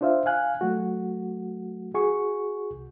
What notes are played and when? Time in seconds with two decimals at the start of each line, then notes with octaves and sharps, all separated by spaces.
0.01 D4 F4 C5 E5 F5
0.26 F5 G#5 F#6
0.61 F#3 A3 F#4
1.94 F#4 G#4 C#6
2.71 C2